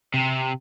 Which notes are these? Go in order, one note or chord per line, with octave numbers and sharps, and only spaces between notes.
C3